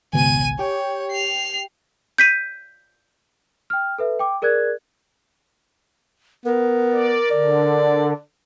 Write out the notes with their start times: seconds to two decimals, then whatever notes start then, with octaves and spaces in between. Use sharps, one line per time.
0.13 G#1 C#2 B2 G#5 D#7
0.59 G4 C#5 G5
1.12 C7 F7
2.18 G6 B6 D#7
3.70 G5 F6
3.99 A4 B4 E5
4.19 G5 D6
4.42 G#4 A#4 D5 F#6 G#6
6.45 B3 A#4
6.92 D5
7.31 D3 D5